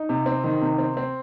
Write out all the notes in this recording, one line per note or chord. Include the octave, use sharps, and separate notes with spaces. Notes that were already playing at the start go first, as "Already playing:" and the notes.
Already playing: D#4
C3
C4
D#3
C3
C4
C4